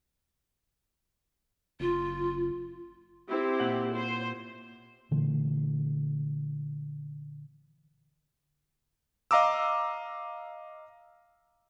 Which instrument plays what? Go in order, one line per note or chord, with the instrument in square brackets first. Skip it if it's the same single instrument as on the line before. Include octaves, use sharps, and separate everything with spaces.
[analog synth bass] F#1 [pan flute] F4
[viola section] C4 E4 G4
[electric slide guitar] A#2 F#5
[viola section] C5
[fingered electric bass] A#2 D3 E3 A3
[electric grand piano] D#5 F5 A#5 D6 E6